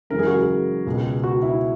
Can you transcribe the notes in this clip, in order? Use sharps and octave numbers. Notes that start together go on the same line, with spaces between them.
F#2 C#3 E3 G#3 A#4
G#4
F#4
G#4
C#2 B2 G#3
F#4
E4